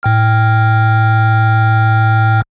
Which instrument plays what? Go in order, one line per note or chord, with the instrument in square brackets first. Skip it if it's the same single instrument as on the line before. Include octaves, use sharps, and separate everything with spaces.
[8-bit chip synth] A2 G5 F6